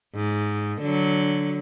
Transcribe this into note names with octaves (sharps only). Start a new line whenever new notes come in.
G#2
D3 F#3